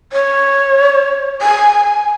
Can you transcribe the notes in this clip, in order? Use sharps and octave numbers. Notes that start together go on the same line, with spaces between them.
C#5
G#5